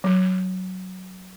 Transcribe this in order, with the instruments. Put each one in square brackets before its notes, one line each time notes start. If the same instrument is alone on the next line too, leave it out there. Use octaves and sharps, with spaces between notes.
[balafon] F#3